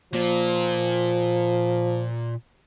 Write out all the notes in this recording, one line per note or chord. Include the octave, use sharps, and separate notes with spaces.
A#2 F3